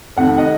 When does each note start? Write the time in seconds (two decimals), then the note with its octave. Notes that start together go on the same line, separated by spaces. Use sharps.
0.17 F1 F2 C3 D#3 F#5
0.38 D#5 F#5